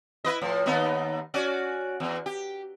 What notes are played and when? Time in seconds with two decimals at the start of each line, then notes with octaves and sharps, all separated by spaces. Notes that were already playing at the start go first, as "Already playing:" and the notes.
0.24 E4 B4 D#5
0.41 A2 F3
0.66 D#2 B3 D#4
1.34 C#4 F#4 D5
2.00 E2
2.26 G4